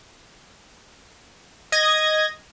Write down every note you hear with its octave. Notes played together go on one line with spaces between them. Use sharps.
D#5 G#6 A#6